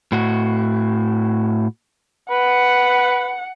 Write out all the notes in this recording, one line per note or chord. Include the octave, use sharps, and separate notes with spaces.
A2 F#4
B4 F#5